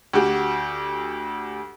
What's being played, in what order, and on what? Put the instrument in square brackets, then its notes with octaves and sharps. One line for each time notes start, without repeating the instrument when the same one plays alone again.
[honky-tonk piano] D2 F#4 G4